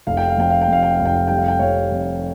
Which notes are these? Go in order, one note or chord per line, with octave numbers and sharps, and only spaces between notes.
F1 F5
G5
F5
F2 G5
F5
G5
F2 F5
G5
F5
F1
G5
F5
G3 G5
F5
G5
F2 C#5 F5
F2